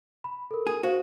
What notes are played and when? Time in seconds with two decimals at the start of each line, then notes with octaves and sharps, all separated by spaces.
0.24 B5
0.51 A4 A#4
0.67 G#4
0.83 F#4 C5 F5